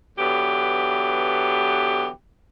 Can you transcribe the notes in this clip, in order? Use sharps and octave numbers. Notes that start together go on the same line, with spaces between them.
D3 E3 F#3 B3 G4